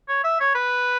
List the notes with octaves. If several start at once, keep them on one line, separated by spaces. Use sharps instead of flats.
C#5
E5
C#5
B4